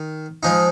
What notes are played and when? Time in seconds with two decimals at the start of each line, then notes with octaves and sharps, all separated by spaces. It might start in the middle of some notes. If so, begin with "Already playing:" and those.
Already playing: D#3
0.43 F3 G#3 D#4